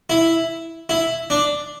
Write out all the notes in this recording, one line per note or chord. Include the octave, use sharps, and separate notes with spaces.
E4
E4
D4